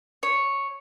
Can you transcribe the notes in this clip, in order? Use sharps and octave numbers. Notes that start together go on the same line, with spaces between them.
C#5